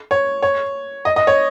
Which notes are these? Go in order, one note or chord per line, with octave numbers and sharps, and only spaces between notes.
C#5
C#5
D#5
D#5
C#5